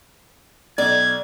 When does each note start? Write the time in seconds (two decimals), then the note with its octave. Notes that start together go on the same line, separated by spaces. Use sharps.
0.78 B1 D5 G#6